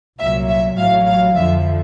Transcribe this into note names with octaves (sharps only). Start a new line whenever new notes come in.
C2 A#2 F#3 E5
E5
A1 A2 F#3 F5
F5
F2 D3 F3 E5